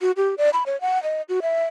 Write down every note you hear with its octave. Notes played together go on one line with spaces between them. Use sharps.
F#4
G4
D5
B5
C#5
F#5
D#5
F#4
E5